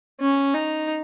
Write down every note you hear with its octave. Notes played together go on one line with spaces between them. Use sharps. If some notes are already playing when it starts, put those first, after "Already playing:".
C#4
D#4